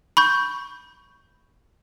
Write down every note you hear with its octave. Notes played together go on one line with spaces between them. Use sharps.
B5 C#6 G6